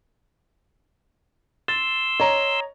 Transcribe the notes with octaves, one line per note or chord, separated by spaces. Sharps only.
C6 E6 A6
C#5 D#5 A#5